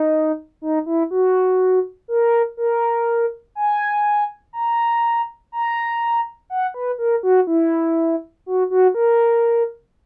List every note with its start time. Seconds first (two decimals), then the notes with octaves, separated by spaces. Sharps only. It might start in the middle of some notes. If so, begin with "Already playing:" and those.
Already playing: D#4
0.62 D#4
0.86 E4
1.11 F#4
2.08 A#4
2.57 A#4
3.55 G#5
4.53 A#5
5.52 A#5
6.50 F#5
6.74 B4
6.98 A#4
7.23 F#4
7.47 E4
8.46 F#4
8.70 F#4
8.94 A#4